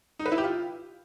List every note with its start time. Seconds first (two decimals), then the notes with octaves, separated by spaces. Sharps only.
0.19 D#4
0.26 B4
0.32 E4
0.38 G4
0.44 F4